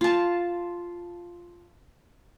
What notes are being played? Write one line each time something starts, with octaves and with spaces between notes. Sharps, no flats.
F4 A5